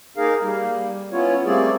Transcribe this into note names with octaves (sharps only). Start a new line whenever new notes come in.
A#3 D#4 G#4 A#4 F5
G3 A#3
B3 C#4 E4 F4 C#5
G3 A3 A#3 C4 G#4 D5